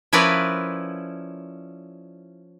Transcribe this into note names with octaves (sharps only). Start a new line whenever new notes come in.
F3 C#4 E4 A#4 B4 D5